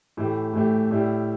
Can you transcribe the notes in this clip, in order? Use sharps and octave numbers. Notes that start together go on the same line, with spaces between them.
A2 E3 A3 G4
A2 E3 A3 G4
A2 G3 E4 G4